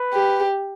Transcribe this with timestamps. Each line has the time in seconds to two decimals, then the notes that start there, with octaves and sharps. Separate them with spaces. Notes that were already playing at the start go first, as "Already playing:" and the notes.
Already playing: B4
0.13 G4